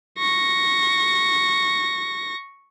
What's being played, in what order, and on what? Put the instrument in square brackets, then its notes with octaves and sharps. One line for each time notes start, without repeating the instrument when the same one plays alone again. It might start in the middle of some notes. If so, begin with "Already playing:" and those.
[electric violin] C#6 A#6